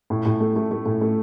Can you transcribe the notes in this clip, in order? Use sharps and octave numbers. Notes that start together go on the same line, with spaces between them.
A2
A2
A3
A3
A3
A2
A3